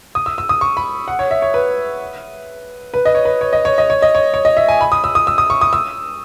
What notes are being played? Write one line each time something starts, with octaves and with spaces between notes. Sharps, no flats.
D#6
E6
E6
D#6
C#6
B5
F#5
C#5
E5
C#5
B4
B4
D#5
C#5
B4
C#5
D#5
C#5
D#5
C#5
D#5
C#5
C#5
D#5
E5
G#5
B5
D#6
E6
D#6
E6
D#6
C#6
D#6
E6